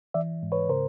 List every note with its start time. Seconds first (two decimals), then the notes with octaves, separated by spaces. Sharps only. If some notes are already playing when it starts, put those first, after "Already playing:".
0.14 E3 D5 E5
0.43 G#2
0.52 B4 C#5
0.69 C#3 A#4 C5